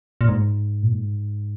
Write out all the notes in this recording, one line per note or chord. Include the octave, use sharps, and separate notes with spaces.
A#2
G#2
A#2
G#2